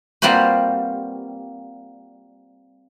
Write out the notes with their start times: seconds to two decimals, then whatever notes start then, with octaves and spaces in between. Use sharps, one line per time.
0.22 G3 A#3 C4 F4 F#4 B4